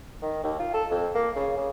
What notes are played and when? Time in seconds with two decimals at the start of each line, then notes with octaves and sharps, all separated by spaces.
0.22 D#3
0.43 D#2
0.59 F4
0.74 A4
0.91 F2
1.15 A#3
1.36 C#3
1.58 C#3